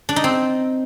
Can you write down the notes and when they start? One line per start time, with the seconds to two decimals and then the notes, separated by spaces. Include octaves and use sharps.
0.09 D4
0.16 D#4
0.24 C4